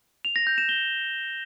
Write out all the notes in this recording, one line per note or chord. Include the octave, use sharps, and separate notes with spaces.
F7
A#6
G6
E7
G7